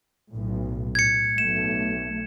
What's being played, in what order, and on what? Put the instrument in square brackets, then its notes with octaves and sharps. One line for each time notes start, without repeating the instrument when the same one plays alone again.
[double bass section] B1 A2
[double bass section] A2 [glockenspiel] G#6 C#7
[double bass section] B1 A3 [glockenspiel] E7